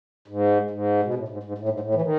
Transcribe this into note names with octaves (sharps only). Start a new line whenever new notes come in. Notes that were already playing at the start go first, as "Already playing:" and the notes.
G#2
G#2
B2
A2
G#2
G#2
A2
G#2
A2
E3
D#3